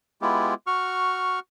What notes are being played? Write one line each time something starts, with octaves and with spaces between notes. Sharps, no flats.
G#3 B3 E4 F4 G4
F#4 C#6 F6